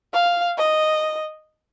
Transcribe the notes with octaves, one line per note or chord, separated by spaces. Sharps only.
F5
D#5